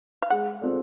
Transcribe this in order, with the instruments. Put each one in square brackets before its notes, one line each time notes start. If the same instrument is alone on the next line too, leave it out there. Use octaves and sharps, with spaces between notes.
[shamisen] F5
[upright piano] G#3 [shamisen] F#5
[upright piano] C4 F4 A4 D5